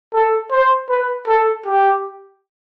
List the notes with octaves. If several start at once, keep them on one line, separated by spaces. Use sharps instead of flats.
A4
C5
B4
A4
G4